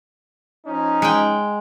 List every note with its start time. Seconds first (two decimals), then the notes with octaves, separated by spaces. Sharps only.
0.66 F3 C#4 D#4
1.02 G#3 G5